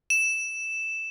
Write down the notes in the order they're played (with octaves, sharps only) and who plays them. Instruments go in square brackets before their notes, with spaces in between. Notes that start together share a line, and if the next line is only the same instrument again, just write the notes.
[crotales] E7